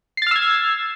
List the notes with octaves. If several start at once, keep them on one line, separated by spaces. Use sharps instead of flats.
E6 F6 G#6 A6 C7